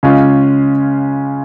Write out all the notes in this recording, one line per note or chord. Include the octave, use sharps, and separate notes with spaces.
C#3 G#3 C#4 F4